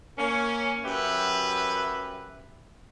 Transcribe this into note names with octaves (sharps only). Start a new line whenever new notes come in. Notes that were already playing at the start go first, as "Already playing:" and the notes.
A#3 C#4
F#2 F#3 G4 B4 E5